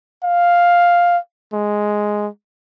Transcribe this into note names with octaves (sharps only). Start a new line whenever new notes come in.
F5
G#3